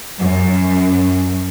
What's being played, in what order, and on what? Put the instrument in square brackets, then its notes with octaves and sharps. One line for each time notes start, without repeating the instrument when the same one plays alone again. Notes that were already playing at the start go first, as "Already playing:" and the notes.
[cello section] F#2